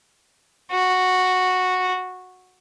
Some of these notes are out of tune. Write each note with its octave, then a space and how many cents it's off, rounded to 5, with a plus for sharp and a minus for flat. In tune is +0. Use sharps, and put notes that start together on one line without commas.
F#4 -5